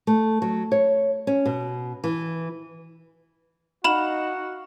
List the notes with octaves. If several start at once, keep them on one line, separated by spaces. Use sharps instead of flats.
A3
F#3
C#5
C#4
B2
E3
D#4 F#4 F5 F#5 B5 E7 F#7